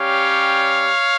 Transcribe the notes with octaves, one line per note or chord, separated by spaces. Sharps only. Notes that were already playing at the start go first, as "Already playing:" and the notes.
Already playing: G3 C#4 G4 C#5 F5